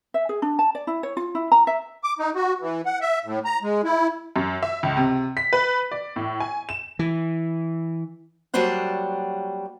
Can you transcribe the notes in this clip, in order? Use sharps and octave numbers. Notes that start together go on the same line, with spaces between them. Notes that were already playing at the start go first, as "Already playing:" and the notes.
E5
G#4
D4
A5
D5
E4
C#5
F4
E4
A#5
E5
D6
D#4
F#4
E3
F#5
E5
A2
A#5
G#3
E4
F#2
E5
C#2
C3
B6
B4
D5
A2
G#5
E7
E3
F#3 G3 A#3 D4 C5 F#5